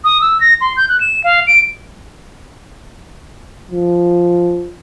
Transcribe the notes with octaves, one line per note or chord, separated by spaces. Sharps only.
D#6
E6
A#6
C6
G6
F#6
E7
F5
D7
F3